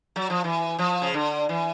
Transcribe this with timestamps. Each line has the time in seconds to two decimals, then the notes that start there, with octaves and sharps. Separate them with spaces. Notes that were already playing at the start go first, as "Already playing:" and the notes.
0.16 F#3
0.30 F3
0.44 E3
0.79 F3
1.02 C#3
1.14 D3
1.49 E3